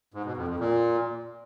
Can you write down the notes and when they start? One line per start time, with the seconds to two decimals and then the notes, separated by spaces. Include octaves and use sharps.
0.14 G#2
0.25 B2
0.37 F2
0.48 F2
0.59 A#2